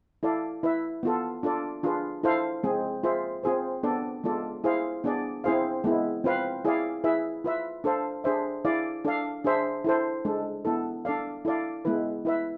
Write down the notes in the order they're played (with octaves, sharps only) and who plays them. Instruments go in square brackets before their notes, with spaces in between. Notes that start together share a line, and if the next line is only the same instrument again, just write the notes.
[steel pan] E4 A4 D5 F5
E4 B4 E5
B3 F4 A4
D4 F4 A4 D5
D4 F4 G#4 B4
E4 A4 C5 F5
G#3 C4 G#4
F4 G#4 C5 E5
C4 F4 G#4 C5
B3 D4 A4 D5
G#3 B3 F4 A4 D5
E4 G#4 C5 F5
B3 D4 G#4 D5
C4 E4 G#4 C5 F5
G#3 B3 E4
C4 F4 B4 F5
E4 G#4 D5 F5
E4 G#4 B4 E5
F4 B4 E5
D4 A4 C5 F5
D4 G#4 C5 E5
E4 G#4 D5 F5
D4 A4 D5 F5
D4 G#4 C5 E5
E4 A4 C5
G#3 D4 A4
B3 E4 A4
D4 A4 D5 F5
E4 A4 D5 F5
G#3 B3 E4 B4
E4 B4 E5